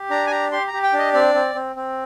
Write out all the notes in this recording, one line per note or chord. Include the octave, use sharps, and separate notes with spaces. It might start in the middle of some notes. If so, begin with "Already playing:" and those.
Already playing: G4
D4 A#5
G#5
G4 A#5
G4 C6
A#5
G4
G5
D4
D#5
C4 D5
C4
C4
C4